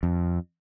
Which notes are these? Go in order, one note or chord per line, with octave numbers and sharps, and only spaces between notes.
F2